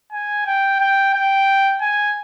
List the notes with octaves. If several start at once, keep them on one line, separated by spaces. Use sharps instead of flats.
G#5
G5
G5
G5
G#5